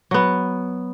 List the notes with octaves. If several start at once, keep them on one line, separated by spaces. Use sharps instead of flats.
F#3 B3